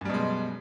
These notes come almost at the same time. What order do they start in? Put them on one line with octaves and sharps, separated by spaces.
F#2 G3 B2 G#3